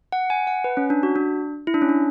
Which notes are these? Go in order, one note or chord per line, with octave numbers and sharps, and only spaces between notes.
F#5
G#5
F#5
B4
C#4
D4
F#4
D4
E4
D4
C#4
D4